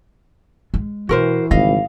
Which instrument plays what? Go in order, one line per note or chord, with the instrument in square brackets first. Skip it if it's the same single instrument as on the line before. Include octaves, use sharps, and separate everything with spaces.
[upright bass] G#3
[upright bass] B2 [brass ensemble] E3 [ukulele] F#4 A#4 C5
[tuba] G#1 [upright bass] C#3 G3 [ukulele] D#5 F5